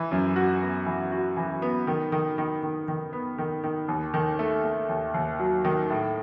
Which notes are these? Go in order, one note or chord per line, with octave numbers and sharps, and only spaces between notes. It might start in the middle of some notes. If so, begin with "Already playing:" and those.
Already playing: E3
F#2
F#4
B3
E3
F#4
E3
B3
D#3
D#3
D#3
D#3
D#3
B3
D#3
D#3
D#2
D#3
A3
A3
D#2
D#2
F#3
D#3
A2